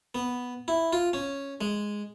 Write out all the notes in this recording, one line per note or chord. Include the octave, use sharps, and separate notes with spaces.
B3
E4
F4
C#4
G#3